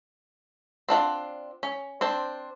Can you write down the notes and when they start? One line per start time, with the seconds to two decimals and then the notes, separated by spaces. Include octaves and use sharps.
0.89 C4 D4 F4 F#5
1.63 C#4
2.01 C4 D4 C5